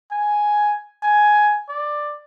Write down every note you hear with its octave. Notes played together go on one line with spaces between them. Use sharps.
G#5
G#5
D5